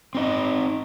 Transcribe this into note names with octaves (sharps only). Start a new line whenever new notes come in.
C4 D#4 D#5